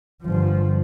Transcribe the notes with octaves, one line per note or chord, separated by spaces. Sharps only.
G1 F3